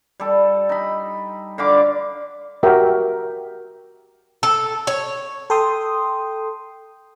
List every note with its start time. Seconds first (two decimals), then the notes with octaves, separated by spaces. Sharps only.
0.20 G3 A4
0.69 D#4 B5
1.58 D3 F5 B5 D6
2.63 F#4 G4 A#4 C#5 E5 G5
4.43 A4
4.87 C#5
5.50 A4 G5 C6 D#6